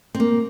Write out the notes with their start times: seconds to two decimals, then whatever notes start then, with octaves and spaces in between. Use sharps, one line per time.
0.15 C4
0.20 A#3